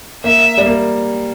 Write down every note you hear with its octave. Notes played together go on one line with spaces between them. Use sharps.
A#3 E5
G3
A#3